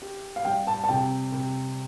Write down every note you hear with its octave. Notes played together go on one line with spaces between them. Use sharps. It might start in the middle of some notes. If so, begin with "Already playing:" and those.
G4
F5
G3 G5
A5
A5
C3 G5
C3